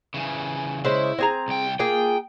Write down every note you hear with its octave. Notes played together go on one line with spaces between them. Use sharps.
C#3 E3
C#3 G#3 E4 C5
C4 G#4 A#5
C2 G5
A#3 F4 G#4 G5